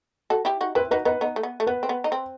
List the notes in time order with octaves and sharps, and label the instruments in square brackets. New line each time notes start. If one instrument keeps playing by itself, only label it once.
[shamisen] F#4 A4
E4 G4
D#4 F#4
[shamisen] C4 E4 [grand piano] B4
[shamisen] D#4 F#4 [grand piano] B4
[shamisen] B3 D#4 [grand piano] B4
[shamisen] B3 D#4
A3
B3
A3
[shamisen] B3 [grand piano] B4
[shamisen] C4
B3
D#4
C4